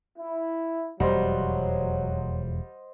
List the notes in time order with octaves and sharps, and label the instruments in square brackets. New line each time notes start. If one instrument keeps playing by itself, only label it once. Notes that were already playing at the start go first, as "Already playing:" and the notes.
[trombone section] E4
[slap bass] E1 F2 [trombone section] F#3 [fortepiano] G3 [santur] C5 D#5 F#5